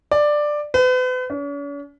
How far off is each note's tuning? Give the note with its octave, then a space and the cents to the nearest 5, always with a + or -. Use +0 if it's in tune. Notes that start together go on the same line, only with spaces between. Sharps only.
D5 +10
B4 +40
C#4 +45